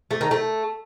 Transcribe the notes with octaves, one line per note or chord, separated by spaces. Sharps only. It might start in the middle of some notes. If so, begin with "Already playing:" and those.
A3
D#3
A3